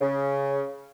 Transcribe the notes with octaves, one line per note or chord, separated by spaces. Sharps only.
C#3